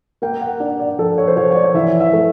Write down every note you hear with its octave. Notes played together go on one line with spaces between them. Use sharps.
A#3 G5
F#5
D4 D5
D5
F3 A4
C#5
C5
F3 C#5
C#5
D5
E3 E5
E5
A3